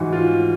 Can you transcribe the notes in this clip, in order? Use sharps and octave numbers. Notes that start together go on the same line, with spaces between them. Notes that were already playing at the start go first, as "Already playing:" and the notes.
Already playing: G#2 E3 F#4
F4